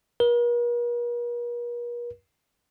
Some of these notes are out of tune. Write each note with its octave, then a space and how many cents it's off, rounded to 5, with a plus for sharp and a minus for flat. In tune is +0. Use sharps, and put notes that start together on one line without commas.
A#4 +45